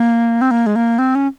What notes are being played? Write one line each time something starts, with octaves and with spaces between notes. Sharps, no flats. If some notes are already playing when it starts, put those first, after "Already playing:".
Already playing: A#3
C4
A#3
G#3
A#3
C4
C#4